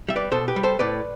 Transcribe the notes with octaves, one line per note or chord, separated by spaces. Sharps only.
G3 E5
B4 D5
B2 A4 C5
G4 B4
G3
A4 C5
A2 B4 D5